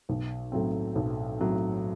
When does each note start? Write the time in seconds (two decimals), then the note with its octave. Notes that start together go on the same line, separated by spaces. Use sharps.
0.09 B1
0.52 A2 F#3 C4
0.95 B1
1.39 A2 F#3 C4